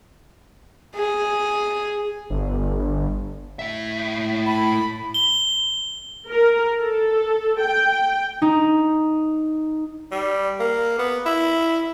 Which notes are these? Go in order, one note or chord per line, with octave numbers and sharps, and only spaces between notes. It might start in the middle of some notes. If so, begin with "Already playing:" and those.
G#4
G1
A2 E5
B5
G7
A#4
A4
G5
D#4
G3
A#3
B3
E4